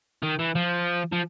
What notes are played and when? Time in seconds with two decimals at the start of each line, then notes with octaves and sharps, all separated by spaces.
0.23 D#3
0.39 E3
0.55 F3
1.13 F3